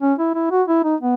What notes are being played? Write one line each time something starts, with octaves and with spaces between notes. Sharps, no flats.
C#4
E4
E4
F#4
E4
D#4
B3